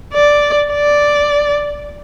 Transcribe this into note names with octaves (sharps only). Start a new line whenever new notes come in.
D5
D5